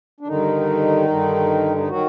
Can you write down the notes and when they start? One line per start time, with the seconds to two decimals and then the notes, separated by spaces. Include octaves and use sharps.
0.21 D4
0.28 G2 D3 D#3 D#4
1.08 G2 D3
1.78 D#4
1.89 D#3 F#3 F#4